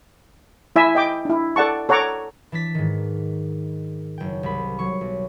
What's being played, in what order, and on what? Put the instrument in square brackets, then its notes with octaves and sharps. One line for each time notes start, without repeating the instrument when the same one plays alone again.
[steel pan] E4 E5 G#5
D#5 G5 D6
D4 E4
A4 D5 F#5 A5 C#6
A4 C#5 F#5 A#5 C#6 D6
[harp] E3 D4 A6 B6
G#2 D#3
F#1 G5
C2 B5
F#3 C#6
B1